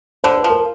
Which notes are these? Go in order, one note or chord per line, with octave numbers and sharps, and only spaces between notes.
D3 C5
B4
F3
A#4